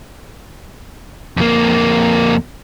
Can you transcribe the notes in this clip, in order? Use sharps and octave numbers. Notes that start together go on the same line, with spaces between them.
F2 A#3